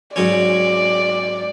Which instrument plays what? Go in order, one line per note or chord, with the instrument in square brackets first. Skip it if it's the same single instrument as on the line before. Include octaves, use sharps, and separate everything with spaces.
[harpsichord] G#2 F#3 C#4 [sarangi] D5